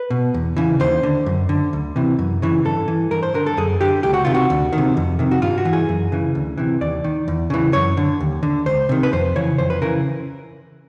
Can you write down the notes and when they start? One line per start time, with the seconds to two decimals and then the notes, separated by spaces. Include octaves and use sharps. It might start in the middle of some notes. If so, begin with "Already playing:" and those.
Already playing: B4
0.10 B2
0.34 E2
0.57 C#3 E3
0.80 D#2 C5
1.03 D3
1.26 F#2
1.49 D3
1.73 D2
1.96 C3 E3
2.19 F#2
2.42 C#3 E3
2.65 G2 A4
2.88 E3
3.11 G2 A#4
3.23 C5
3.34 D3 A#4
3.46 A4
3.57 F#2 G#4
3.81 D3 G4
4.03 C#2 G4
4.14 F#4
4.25 C3 D#3 F4
4.34 F#4
4.50 D2
4.73 D#3
4.78 C3
4.97 F2
5.19 C3 D#3
5.31 F#4
5.42 G2 F4
5.58 F#4
5.65 E3
5.73 G#4
5.89 F#2
6.12 C#3 E3
6.35 D2
6.58 C3 E3
6.81 D#2 D5
7.04 D#3
7.28 E2
7.50 C#3 E3
7.73 F#2 C#5
7.97 D3
8.20 D#2
8.43 D3
8.66 C#2 C5
8.89 C3 D#3
9.03 B4
9.13 F2 C5
9.36 C#3 E3 C#5
9.58 F2 C5
9.70 B4
9.82 C#3 E3 A#4